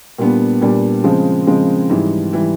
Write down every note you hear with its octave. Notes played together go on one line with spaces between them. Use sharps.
A#2 G3 B3 D4
A#2 G3 B3 D4
C#3 F3 G#3 C4
C#3 F3 G#3 C4
G#2 E3 G3
E3 G3